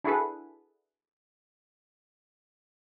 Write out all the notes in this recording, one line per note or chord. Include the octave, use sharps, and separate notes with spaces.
D4 E4 F#4 G#4 A4 B4